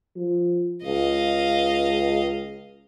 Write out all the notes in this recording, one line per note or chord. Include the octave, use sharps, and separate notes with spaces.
F3
C#2 D#5 F5